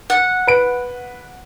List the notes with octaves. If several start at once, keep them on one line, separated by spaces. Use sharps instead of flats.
F#5
B4 D7